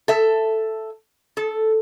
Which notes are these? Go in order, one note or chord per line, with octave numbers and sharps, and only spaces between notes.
A4 E5
A4